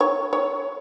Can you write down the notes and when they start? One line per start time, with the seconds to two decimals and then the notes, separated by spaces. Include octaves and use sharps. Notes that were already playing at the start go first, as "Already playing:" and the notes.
0.01 C#5
0.33 C#5